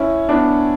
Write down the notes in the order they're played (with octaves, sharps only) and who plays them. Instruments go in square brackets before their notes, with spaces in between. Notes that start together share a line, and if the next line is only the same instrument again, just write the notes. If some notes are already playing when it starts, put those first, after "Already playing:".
Already playing: [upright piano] C#4 E4
B3 D4